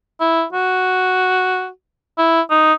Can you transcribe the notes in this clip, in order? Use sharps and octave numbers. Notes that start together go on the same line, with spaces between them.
E4
F#4
E4
D#4